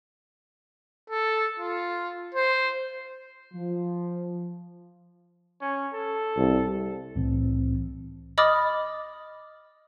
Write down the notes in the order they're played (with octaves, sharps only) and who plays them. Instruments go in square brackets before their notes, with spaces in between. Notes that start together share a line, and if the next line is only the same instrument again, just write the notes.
[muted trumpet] A4
F4
C5
[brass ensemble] F3
[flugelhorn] C#4
A4
[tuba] C2
[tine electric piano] C2 A2 E3 C4
[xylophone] D#5 B5 D6 D#6 F6 A6